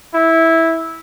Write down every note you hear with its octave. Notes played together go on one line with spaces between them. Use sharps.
E4